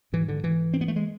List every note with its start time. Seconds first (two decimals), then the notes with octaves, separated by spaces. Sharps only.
0.13 G#2 E3
0.28 D3
0.44 E3
0.74 C4
0.81 B3
0.88 A3
0.96 G#3